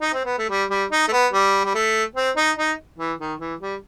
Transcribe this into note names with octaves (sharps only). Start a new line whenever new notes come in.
D#4
C4
B3
A3
G3
G3
D#4
A3
B3
G3
G3
A3
C4
D#4
D#4
E3
D#3
E3
G3